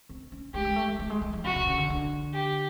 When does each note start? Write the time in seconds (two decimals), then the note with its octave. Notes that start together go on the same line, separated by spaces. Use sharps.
0.09 C4
0.32 C#4
0.54 G#3 G4
0.65 G#3
0.76 A3
0.88 G#3
0.99 G3
1.10 G#3
1.22 G3
1.33 F3
1.44 C3 F#4
1.56 C#3
1.67 C#3
1.77 D3
1.90 D3
2.34 G4